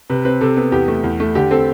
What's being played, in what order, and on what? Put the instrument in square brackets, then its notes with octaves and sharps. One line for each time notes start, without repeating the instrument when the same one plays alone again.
[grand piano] C3 B4
C4 B4
C3 A4
B3
E2 G4
A3
E2
A3
D3 G4
C4 A4